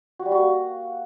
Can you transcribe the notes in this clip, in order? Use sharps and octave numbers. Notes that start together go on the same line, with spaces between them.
F#4
G3
F#4
A#3